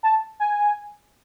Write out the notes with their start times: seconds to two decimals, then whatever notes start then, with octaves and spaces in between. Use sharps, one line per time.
0.03 A5
0.40 G#5